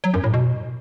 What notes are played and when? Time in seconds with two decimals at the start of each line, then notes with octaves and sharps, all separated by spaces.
0.04 F#3
0.14 F#2
0.24 A2
0.34 B2